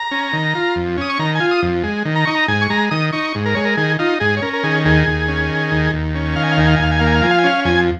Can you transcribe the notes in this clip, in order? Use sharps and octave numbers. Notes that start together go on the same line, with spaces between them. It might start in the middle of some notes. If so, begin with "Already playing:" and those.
Already playing: A#5
C#4
D#3
F4
F2
C#4 D#6
C#6
D#3 A#5
G#5
F4
D#6
F2
G#3
D#3
A#5
D#4 C#6
A#5
G#2 G#5
C#6
G#3 A#5
D#3 D#6
D#4 C#6
G#2
A#4
G#3 C#5
A#4
D#3 G#4
D#4 F4
G#2 G#4
C#5
C#4 A#4
A#4
D#3 G#4
D#2 G#4
D#2
C#4
D#3
D#2
D#2
C#4
D#3 F5
G#5
F5
D#2 G#5
F5
G#5
D#2 F5
G#5
A#3 F5
G#5
F5
F3 G#5
F5
G#5
C#4 F5
F2 G#5